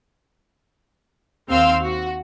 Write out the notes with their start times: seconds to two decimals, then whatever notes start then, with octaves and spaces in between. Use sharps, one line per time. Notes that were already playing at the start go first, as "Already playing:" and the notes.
1.49 D#2 C4 F5 C6 E6
1.83 F#4